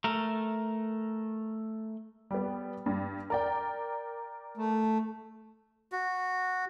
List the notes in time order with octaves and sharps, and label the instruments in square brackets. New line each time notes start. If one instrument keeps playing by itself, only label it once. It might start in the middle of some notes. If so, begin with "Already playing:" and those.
[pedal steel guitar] A3 A#4
[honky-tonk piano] G3 B3
G2 G3
A#4 D5 G5
[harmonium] A3
[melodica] F#4